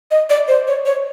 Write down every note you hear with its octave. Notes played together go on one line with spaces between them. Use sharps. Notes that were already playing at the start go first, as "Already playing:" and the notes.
D#5
D5
C5
C#5
C#5